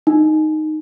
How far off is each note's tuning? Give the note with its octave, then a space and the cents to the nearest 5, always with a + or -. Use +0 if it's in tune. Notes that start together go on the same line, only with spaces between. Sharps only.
D#4 -5